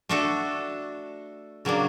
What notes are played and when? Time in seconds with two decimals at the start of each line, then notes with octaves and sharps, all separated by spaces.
0.09 A3 D4 F#4 A4
1.65 C#3 F#3 A#3 D4